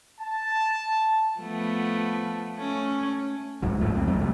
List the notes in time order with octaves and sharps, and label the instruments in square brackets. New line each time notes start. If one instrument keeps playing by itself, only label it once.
[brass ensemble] A5
[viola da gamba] F3 A3 B3
A3 C#4
[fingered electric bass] C#2 G#2 F#3
D1 G#1 F3 A3
C2 F2 F#3 C4
F#3 A3
C3 G3 A3